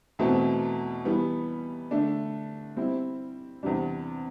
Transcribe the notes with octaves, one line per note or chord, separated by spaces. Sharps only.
E2 B2 A3 C4
E3 G3 B3
D3 A3 D4
G3 C4 E4
E2 C3 G3 D4